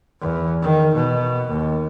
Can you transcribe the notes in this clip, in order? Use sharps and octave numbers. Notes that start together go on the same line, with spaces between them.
E2
D#3
B2
D#2